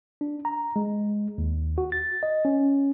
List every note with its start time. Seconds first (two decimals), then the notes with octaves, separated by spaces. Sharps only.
0.21 D4
0.45 A#5
0.76 G#3
1.38 D#2
1.78 F#4
1.92 A6
2.23 D#5
2.45 C#4